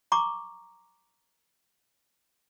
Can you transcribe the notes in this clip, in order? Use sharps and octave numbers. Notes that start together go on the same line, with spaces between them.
A#5 C#6 D6